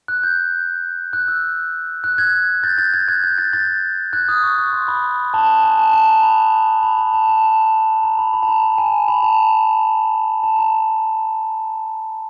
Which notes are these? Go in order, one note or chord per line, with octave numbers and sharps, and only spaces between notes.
F#6
G6
F#6
E6
F#6
F#6 G#6
G6 A6
G6 A6
F#6 G#6
F#6 G#6
G6
G6 A6
G6 A6
F#6 G#6
D#6
C#6
C#6
C6
B5
A5
G#5
A5
A5
A#5
B5
B5
A5
A5
A5
A5
A#5
B5
B5
A5
A#5
A5
G#5
B5
A5
A5
A#5